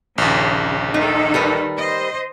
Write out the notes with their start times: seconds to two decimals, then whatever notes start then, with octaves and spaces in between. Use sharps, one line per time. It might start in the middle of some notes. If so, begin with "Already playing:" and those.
0.18 A#1 D#2 C#3
0.94 D#3 D#4 A4
1.34 G3 A#4 B4
1.78 C5 D#5